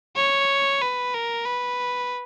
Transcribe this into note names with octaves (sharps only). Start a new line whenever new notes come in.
C#5
B4
A#4
B4